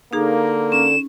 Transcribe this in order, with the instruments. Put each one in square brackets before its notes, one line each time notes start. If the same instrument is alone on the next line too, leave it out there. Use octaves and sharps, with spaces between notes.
[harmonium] D3 [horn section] A#3 [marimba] D#4 G#4
[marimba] C#4 [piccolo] E7